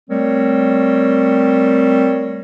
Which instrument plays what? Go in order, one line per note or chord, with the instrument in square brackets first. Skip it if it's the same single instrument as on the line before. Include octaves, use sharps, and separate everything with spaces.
[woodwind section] G3 A3 C4 A#4 C#5